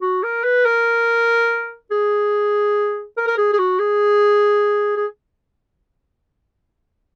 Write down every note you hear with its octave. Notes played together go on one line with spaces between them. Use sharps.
F#4
A#4
B4
A#4
G#4
A#4
A#4
G#4
G#4
F#4
G#4
G#4